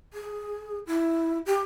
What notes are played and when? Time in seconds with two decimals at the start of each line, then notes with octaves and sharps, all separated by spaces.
0.13 G#4
0.87 E4
1.46 G4